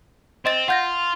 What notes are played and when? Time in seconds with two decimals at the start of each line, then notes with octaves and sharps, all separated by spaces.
0.46 C4 D#5 A6
0.68 F4 F#5 G6 A#6